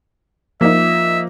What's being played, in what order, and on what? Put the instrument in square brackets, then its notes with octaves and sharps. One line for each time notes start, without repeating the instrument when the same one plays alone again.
[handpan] F3 [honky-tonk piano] A#3 D#4 [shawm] E5